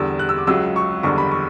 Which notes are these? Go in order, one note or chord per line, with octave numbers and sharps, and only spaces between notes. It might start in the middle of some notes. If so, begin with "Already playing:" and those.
Already playing: E2 D3 G3 E6
F#6
E6
D6
C#2 C#3 F#3 E6
C#6
F#1 E2 D3 G3 C#6
B5
C#6